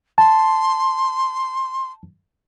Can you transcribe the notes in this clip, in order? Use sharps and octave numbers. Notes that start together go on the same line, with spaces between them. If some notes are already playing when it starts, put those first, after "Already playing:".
A5 C6